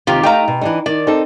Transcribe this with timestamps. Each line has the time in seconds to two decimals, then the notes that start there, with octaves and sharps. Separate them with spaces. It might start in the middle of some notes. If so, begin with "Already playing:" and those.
0.07 D#2 C3 D#3 F4 G4
0.23 A3 D#4 F5 G5 A#5
0.48 B2
0.61 E3 D4 D#4
0.86 D#3 D5
1.07 C4 D#4 A4